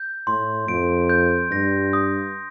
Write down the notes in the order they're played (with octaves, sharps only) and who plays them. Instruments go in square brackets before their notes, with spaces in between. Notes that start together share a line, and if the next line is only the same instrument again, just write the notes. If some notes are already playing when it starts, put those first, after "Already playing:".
Already playing: [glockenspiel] G6
[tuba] A2 [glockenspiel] C6
[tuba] F2 [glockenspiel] D7
[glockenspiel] G6
[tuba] G2 [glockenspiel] A#6
[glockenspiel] D#6